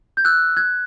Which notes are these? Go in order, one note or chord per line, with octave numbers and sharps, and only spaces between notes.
G6
E6 F#6
F#6 G#6